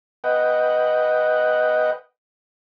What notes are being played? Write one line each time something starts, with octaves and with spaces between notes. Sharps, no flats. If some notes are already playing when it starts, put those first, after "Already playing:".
B4 D#5 F#5 G5